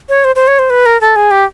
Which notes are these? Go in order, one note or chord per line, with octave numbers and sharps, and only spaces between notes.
C#5
C5
C5
C#5
C5
B4
A#4
A4
G#4
G4